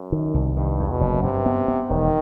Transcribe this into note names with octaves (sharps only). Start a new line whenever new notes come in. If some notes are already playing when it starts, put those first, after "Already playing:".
Already playing: F#2
D#3
C2
G2 D#3
E2
B2
F#1
G2 C3
B3
B3
E1 D#3